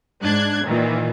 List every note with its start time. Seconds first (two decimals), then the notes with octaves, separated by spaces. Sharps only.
0.22 G#2 D4 F#6 G#6
0.66 A#2 D#3 E3